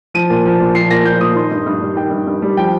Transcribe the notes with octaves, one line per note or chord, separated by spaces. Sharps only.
F3 D#7
A#2
F3
A#2
F3 C7
A#2 A#6
F3 G6
A#2 D#6
D#3 C6
G2
G2
G3
D#3 G5
G2
G2
G3
F3 G5